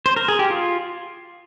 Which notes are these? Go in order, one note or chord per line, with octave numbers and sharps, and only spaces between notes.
C5
A#4
G#4
G4
F4